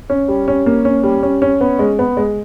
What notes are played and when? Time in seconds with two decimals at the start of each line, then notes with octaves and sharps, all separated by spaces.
0.10 C#4
0.28 G3
0.48 C#4
0.66 A#3
0.85 C#4
1.03 G3
1.23 C#4
1.42 C#4
1.61 B3
1.79 G#3
1.99 B3
2.17 G#3